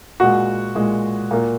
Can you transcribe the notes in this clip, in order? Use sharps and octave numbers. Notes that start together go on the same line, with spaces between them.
A#2 G#3 F#4
A#2 G#3
A#2 A#3